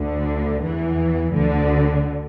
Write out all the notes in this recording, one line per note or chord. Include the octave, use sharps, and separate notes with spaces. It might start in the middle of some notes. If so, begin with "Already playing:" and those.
Already playing: D2 D3
E2 E3
D2 D3